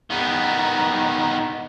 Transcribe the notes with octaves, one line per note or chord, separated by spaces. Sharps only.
D#3 B3